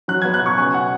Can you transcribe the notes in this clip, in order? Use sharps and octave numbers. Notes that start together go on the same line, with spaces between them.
F#3 F#6
G#6
B3
F#6
B2 C#6
C#3 G#5
F#5